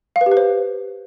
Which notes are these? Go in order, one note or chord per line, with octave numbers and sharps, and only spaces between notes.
F5
B4
G4
B4
C5